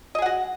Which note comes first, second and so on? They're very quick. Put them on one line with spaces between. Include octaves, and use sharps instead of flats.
D#5 G#4 F#5 F#4